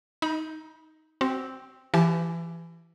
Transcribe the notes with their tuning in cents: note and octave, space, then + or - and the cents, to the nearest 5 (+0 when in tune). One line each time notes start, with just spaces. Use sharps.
D#4 +10 B5 -35
C4 +0 F#4 +30
E3 +25 G4 +0 A5 -30